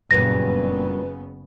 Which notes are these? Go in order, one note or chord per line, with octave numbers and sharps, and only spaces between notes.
F#1 G2 A#2 C#3 F#3 B3 B4 A#6